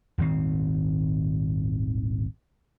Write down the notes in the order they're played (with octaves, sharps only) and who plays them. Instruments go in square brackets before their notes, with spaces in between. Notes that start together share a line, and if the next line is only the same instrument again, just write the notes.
[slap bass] D#1 G#1 D#3 C4